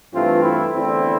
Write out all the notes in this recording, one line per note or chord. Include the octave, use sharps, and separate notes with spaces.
G2 E3 A3 C4 F4
E4
E2 D3 A3 C4 E4